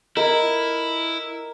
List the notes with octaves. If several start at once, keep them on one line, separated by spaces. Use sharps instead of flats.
E4 A#4 D#5